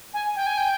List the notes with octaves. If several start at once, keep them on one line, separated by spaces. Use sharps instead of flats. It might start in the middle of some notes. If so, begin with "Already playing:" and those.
G#5
G5
G#5
G5